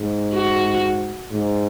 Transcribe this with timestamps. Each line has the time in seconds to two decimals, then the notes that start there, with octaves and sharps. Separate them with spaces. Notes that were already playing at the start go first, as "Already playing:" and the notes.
Already playing: G#2
0.34 F#4
1.32 G#2